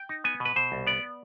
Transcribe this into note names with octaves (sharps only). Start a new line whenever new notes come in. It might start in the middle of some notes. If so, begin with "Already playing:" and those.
Already playing: G5
D#4
B3 G#5
B2
B4
B2 C5
C2
B3 D5